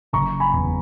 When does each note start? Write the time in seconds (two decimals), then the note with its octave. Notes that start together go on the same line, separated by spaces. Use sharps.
0.13 F#1 A#5 C#6
0.40 G#5 B5
0.54 E2